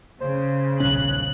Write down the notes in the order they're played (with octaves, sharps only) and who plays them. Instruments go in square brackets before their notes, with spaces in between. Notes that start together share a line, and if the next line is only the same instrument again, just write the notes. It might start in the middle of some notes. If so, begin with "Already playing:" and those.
[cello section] C#3 [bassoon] C5
[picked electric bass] D#1 C#4 [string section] B1 F#6